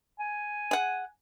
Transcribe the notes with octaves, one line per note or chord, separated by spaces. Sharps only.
G#5
G#4 F#5